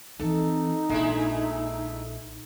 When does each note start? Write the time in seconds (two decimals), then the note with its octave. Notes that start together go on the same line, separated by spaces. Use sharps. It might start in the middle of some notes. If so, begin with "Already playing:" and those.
0.20 E3 C4 D#4 A4
0.90 A#1 G#3 A3 E4